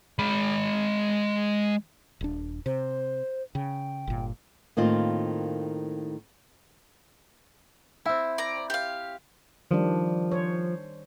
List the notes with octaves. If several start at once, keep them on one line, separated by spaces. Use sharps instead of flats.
G#3 B5
D#1 D4
C3 C5
C#3 G5
G1 A#2
A2 D#3 A#3 C4 F4
C4 E4 E5
D5 A#5
G4 F5
D#3 F3 G3 D4
C5 C#5